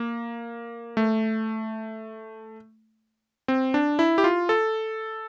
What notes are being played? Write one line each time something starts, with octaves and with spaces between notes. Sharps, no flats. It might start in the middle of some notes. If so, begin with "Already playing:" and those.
Already playing: A#3
A3
C4
D4
E4
G4
F4
A4